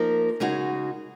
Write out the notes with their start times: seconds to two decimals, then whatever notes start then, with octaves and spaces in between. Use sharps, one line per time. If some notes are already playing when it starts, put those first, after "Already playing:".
Already playing: F3 A#3 D#4 A#4
0.40 C#3 G#3 D#4 F#4